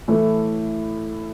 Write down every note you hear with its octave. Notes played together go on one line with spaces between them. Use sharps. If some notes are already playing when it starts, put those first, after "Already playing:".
A2 E3 A3